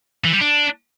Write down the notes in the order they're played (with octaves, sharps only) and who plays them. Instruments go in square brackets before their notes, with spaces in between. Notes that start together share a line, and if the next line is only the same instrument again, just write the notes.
[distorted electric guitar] E3
G3
D4